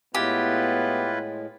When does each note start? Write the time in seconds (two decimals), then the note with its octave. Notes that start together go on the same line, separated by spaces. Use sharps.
0.15 A2 G#3 B3 E4 F4 G4 B4